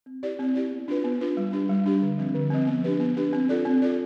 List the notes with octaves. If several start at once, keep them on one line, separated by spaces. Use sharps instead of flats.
C4
E4 G4 D5
C4
E4 G4 D5
B3
D4 F4 B4
B3
D4 F4 B4
G3
D4 G4
G3
D4 G4
D3
F3 C4
D3
F3 C4
B3
D4 G4 B4
B3
D4 G4 B4
C4
F4 A4 D5
C4
F4 A4 D5